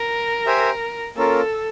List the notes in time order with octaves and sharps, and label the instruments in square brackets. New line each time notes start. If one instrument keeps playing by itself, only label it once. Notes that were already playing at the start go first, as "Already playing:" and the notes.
Already playing: [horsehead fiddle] A#4
[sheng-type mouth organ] G4 C5 E5 G#5
[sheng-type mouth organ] A#3 C#4 F4 A#4 [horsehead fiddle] A4